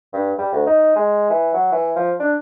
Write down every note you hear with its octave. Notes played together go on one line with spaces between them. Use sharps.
G2
G3
D2
D#4
G#3
E3
F#3
E3
F3
D4